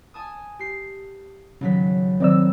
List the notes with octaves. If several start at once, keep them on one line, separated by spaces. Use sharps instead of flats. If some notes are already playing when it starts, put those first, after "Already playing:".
G#5 A5 D#6
G4 C7
G#1 C#3 F#3 B6
D#3 F#3 C4 D5 E6